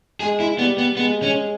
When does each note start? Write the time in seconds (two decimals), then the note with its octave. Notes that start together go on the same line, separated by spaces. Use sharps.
0.20 G#3 G#4
0.40 E4
0.59 G3 B3
0.78 B3
0.97 G#3 B3
1.23 C#4